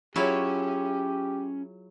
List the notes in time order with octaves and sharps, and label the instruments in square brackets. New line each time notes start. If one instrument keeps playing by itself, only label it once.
[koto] F#3 E4 [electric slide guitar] C#4 [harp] F4 G#4 C#5 [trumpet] G4